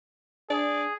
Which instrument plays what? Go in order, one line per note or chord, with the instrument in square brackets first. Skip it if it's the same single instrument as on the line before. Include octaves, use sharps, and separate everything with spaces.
[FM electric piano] D4 [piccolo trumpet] G#4 [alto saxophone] D5